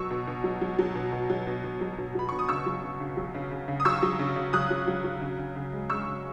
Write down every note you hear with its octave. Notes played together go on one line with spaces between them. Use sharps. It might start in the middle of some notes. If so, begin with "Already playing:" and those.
Already playing: B2 F#3 C#6 E6
B2
B2
F#3
F#3
F#3
B2
B2
F#3
B2
B2
F#3
B2
F#3 B5
B2 C#6
D#6
C#3 C#6 E6
F#3
C#3
C#3
F#3
C#3
C#3
C#3
D#6
F#3 C#6 E6
F#3
C#3
C#3
F#3 D#6 F#6
F#3
F#3
F#3
C#3
C#3
C#3
G#3
G#3 C#6 E6
C#3